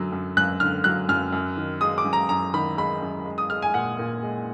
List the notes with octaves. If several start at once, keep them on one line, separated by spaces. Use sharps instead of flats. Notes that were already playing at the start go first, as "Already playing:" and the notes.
Already playing: F#2 D3 F#3
F#2
F#2 F#6
D3 F6
F#3 F#6
F#2 F6
F#2
D#3
G#3 D#6
D6
F#2
A#5
F#2 A#5
D#3 B5
G#3 B5
F#2
G#3
D#6
G#3 F6
G#5
A#2 F#5
A#2
G#3